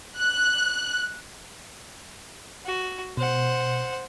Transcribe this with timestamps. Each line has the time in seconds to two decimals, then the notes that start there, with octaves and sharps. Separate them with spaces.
0.18 F#6
2.65 F#4
3.17 B2 C5 F#5